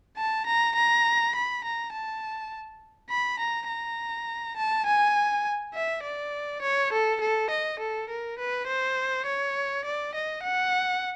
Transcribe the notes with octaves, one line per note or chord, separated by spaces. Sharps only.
A5
A#5
A#5
B5
A#5
A5
B5
A#5
A#5
A5
G#5
E5
D5
C#5
A4
A4
D#5
A4
A#4
B4
C5
C#5
D5
D#5
F#5